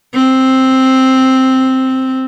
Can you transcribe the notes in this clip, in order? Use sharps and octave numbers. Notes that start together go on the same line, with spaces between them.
C4